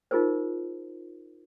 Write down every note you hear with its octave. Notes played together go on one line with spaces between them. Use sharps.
D#4 F4 G#4 A#4 C5